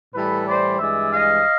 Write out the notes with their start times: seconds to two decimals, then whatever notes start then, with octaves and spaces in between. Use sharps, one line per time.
0.13 A2 E3 G3 A4 B4
0.46 C5 D5
0.79 G2 E3 G#3 D5 E5
1.12 D#5 F5